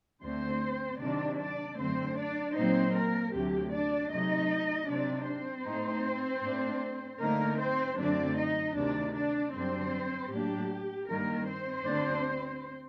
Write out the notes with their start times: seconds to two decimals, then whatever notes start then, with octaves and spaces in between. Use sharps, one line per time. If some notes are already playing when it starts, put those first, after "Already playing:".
0.22 D2 D3 A3 C4 C5
0.99 C3 D#3 F#3 C4 D4 D5
1.39 D4 D5
1.77 F#2 D3 A3 C4 C5
2.16 D4 D5
2.54 A#2 F#3 A#3 C4 D#4 C5
2.93 A#3 A#4
3.32 D2 C3 F#3 G4
3.71 D4 D5
4.10 C3 F#3 A3 D#4 D#5
4.87 C3 F#3 C4 D4 D#4 D5
5.26 C4 C5
5.65 A2 A3 D#4
6.43 A2 A3 D4
7.20 D3 A3 A#3 D#4 A#4
7.59 C4 C5
7.97 F#2 D3 F#3 A3 C4 D4 D5
8.36 D#4 D#5
8.75 D2 C3 D#3 D4 D5
9.14 D4 D5
9.53 F#2 D3 G3 C4 D4 C5
10.30 A2 F#3 A#3 D4 G4
11.07 G2 D#3 G3 A#3 A#4
11.47 C4 C5
11.85 D2 D3 A3 D4